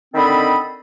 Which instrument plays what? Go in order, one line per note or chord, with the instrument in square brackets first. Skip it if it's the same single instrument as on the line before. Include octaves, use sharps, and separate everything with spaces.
[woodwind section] D3 D#3 C4 A4 D#5 B5